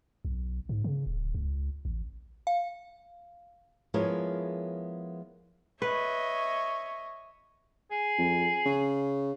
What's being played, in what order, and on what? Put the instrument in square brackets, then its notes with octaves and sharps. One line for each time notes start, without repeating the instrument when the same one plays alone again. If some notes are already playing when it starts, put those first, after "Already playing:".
[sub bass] B1
G#2
C#3
D1
C#2
A1
[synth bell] F5
[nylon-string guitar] F3 G#3 B3 E4 A#4 C#5
[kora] B4 [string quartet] C#5 D#5 E5
[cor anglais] G#4
[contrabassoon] F2
C#3